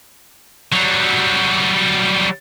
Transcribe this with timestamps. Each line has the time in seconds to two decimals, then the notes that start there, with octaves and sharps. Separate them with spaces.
0.73 F#3 G3